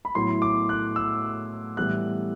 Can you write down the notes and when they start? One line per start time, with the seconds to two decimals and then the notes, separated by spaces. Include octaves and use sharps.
0.05 B5
0.15 A2 F#3 B3 E4 C6
0.42 D6
0.69 F#6
0.96 E6
1.77 A2 E3 G3 B3 F#6